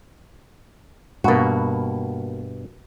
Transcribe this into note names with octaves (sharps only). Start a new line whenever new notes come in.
G2 B2 A#3 F#4